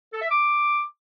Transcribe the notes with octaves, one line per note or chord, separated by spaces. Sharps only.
A4
E5
D6